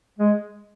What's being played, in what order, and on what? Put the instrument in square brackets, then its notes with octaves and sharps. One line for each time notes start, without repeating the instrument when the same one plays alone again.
[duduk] G#3